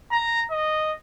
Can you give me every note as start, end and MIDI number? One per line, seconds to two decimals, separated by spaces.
0.12 0.42 82
0.51 0.93 75